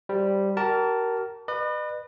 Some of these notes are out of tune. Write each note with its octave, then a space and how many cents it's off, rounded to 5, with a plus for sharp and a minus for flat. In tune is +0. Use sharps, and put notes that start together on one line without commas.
G3 +0 C5 +0
G4 -45 A#4 +0 A5 +0
B4 +0 D#5 -45